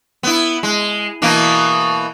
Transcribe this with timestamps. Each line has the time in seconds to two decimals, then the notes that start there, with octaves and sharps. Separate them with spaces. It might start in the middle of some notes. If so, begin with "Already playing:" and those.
0.23 B3 E4
0.63 G#3
1.22 B2 E3 A#3